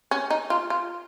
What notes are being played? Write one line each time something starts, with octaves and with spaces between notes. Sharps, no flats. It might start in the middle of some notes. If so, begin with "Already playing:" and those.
C#4
D#4
F4
F4